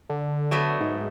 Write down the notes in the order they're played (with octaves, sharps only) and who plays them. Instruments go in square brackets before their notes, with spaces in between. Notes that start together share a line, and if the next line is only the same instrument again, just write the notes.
[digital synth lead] D3
[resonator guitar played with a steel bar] F#3 A3 B3
[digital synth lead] G#2